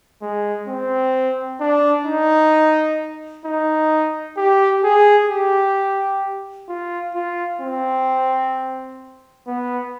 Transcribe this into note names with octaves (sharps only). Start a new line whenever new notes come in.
G#3
C4
D4
D#4
D#4
G4
G#4
G4
F4
F4
C4
B3